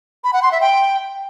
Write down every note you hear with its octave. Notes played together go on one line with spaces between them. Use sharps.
B5
F#5
C6
E5
G5